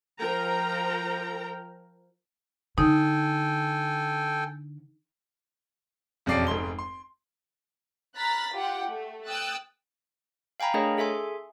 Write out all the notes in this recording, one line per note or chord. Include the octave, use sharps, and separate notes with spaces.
F3 A#4 G5 A#5
D3 D#4 A4 G5 G#5
E1 F2 C#4 D5 C7 D7
F1 G#2 C6 G7
C6
A#5 B5 F6 F#6 A6 B6
F4 G4 F#5 G5
A3
G5 D#6 E6 F#6 A6
F5 G5 G#5 A#5 B5
A3 D4 G#4 A#4 C#5 D#5
G#4 A4 E5 G#5 C6